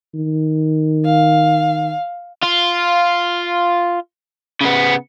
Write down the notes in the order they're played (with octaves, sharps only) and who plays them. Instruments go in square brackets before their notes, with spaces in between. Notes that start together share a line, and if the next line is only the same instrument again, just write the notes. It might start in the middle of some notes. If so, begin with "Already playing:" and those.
[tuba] D#3
[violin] F5
[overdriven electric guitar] F4
C#3 B3